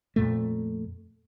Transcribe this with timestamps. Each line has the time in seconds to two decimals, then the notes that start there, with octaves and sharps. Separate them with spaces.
0.16 F2 A#2 A3